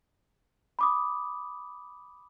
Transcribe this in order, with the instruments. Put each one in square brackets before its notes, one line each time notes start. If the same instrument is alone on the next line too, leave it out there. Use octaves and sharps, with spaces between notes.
[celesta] B5 D6 D#6